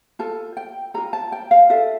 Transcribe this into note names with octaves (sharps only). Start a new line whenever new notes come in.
F4 A4 A5
G5
F4 A4 A#5
A5
G5
F5
F4 A4 E5